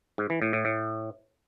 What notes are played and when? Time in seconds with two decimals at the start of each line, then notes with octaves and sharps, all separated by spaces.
0.18 G#2
0.30 E3
0.42 A2
0.53 A2
0.65 A2